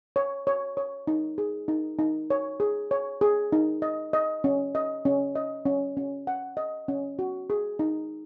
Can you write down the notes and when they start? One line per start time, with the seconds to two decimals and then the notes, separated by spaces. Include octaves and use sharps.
0.16 C#5
0.47 C#5
0.77 C#5
1.07 D#4
1.38 G#4
1.68 D#4
1.99 D#4
2.30 C#5
2.60 G#4
2.91 C#5
3.21 G#4
3.52 D#4
3.82 D#5
4.13 D#5
4.44 C#4
4.75 D#5
5.05 C#4
5.36 D#5
5.65 C#4
5.97 C#4
6.27 F#5
6.57 D#5
6.88 C#4
7.19 F#4
7.50 G#4
7.79 D#4